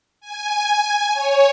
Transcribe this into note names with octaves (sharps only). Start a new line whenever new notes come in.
G#5
C#5